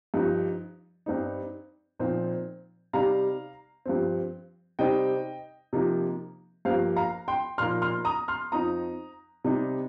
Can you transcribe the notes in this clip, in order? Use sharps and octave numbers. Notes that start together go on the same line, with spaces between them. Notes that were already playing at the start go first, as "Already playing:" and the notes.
G2 F3 D#4
G2 G3 C4 D#4
A#2 F3 C4 D#4
C3 G3 D#4 F5 A#5
G2 F3 C4
C3 G3 C4 D#4 D#5 G5
C3 F3 A#3 D#4
G2 F3 A#3 C5 F5
F5 A#5
G5 C6
A#2 F3 A#3 D#4 C6 F6
C6 F6
A#5 D#6
C6 F6
F2 F3 C4 D#4 A#5 D#6
C3 G3 D#4